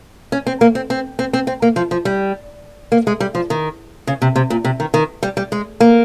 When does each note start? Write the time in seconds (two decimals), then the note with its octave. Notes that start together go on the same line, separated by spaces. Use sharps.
0.32 C#4
0.47 C4
0.61 A#3
0.75 C4
0.90 C4
1.19 C4
1.33 C4
1.47 C4
1.62 A#3
1.76 F3
1.91 F3
2.05 G3
2.92 A#3
3.07 G#3
3.20 G3
3.35 F3
3.50 D#3
4.07 C#3
4.22 C3
4.36 C3
4.50 A#2
4.65 C3
4.80 D#3
4.94 D#3
5.23 G3
5.37 G3
5.52 G#3
5.80 A#3